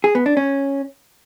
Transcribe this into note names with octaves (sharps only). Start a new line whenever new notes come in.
G#4
B3
D4
C#4